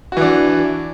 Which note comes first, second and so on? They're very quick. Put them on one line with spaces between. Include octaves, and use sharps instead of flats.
F#4 E3 D4